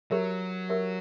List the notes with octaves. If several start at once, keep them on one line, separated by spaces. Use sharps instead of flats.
F#3 G4 A#4 C#5 E5
G4 A#4 C#5 E5